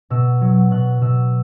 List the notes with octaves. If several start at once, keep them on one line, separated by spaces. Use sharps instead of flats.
B2 E6
F#3
B2 F#6
B2 E6